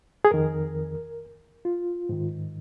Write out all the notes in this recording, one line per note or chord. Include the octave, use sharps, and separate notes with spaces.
G#4
F2 D#3 A#4
F4
G#2 D#3